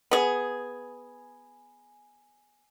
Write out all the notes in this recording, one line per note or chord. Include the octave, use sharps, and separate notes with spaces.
B3 G#4